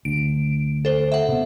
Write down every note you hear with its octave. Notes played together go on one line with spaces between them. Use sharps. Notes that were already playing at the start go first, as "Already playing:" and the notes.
D2 D7
A4 C5
E5 F#5
C3 B3